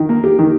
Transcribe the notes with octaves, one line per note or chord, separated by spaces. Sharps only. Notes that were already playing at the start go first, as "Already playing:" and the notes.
Already playing: D#3
A#3
G4
D#3